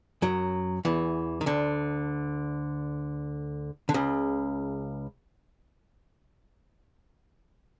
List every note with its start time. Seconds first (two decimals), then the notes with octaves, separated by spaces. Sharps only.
0.22 F#2 F#3
0.85 E2 E3
1.41 D#3
1.46 D2 D3
3.89 D3
3.94 C#2 C#3